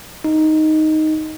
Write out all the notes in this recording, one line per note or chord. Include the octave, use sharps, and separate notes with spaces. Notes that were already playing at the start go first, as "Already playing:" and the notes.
D#4